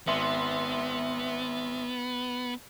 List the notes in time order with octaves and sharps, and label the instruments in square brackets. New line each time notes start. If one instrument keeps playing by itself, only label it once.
[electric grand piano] G#1 E5 C6 [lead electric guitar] B3